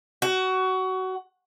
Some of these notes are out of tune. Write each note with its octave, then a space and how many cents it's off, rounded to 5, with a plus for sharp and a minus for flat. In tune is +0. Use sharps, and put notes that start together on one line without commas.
F#4 +20